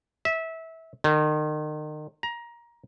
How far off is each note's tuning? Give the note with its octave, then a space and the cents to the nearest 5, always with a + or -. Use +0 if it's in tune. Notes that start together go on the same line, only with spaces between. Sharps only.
E5 -20
D#3 -35
A#5 +20